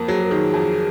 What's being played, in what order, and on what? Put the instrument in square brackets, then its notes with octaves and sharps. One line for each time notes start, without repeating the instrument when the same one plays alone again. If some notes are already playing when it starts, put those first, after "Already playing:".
Already playing: [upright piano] F2 A#3
[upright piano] F#3 [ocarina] G#4
[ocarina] A#4
[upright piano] D#3 [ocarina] G#4
[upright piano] F2